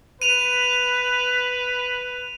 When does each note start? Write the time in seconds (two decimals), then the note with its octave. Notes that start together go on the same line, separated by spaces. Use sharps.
0.22 B4 D#7 F7